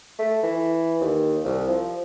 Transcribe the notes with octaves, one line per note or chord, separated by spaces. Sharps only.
A3
E3
D#2
C2
F3